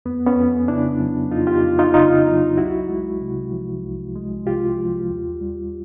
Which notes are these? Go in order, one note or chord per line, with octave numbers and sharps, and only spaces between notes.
F2 B3
B3 C#4
F2
C#3 D4 E4
F#3
F2 D#4 F4
F4 G4
F2
D#4 F4
C#3 D#4 F4
F#3
C2 E4 F#4
G#3
C3
F3
C2
G#3
C3 F4 G4
F3
D#2
G3